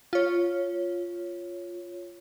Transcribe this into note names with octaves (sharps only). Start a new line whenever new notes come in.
F4 C#5